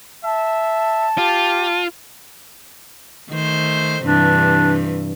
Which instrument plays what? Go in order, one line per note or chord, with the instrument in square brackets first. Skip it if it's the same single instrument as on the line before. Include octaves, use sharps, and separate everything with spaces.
[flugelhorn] E5 [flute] A5
[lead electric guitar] F4 [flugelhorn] G4
[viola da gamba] D#3 A3 C5
[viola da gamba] G2 C3 E3 [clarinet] D4